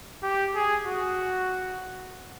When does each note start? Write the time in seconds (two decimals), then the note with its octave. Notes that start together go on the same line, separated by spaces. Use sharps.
0.23 G4
0.55 G#4
0.87 F#4